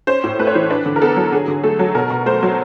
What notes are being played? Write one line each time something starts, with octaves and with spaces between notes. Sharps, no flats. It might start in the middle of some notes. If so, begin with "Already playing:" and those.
C#4 C5
A2
A3 B4
C#5
E3 C5
D4 B4
D3
A#4
B3 A4
F#3
D3 G#4
D3
A3 A4
F#3
B2 A#4
B2
A3 C5
F#3